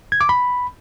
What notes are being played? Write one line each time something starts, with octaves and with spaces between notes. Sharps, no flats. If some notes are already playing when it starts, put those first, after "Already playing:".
G#6
D6
B5